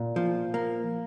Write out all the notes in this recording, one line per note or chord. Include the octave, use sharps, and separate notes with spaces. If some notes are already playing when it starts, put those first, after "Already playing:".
Already playing: A#2
F3
A#3